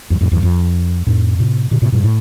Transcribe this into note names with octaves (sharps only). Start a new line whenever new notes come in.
E2 G2
F2 A2
E2 G2
F2
F2 A2
A2 C3
A#2 D3
A2 C3
G2 A#2
A2